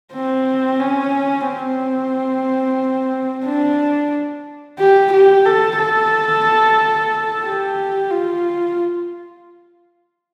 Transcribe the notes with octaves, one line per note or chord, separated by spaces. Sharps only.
C4
C#4
C4
D4
G4
G4
A4
A4
G4
F4